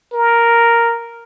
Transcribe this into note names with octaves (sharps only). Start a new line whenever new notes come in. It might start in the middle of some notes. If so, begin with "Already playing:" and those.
A#4